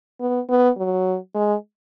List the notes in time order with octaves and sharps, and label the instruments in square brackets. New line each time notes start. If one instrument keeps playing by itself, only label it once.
[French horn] B3
B3
F#3
G#3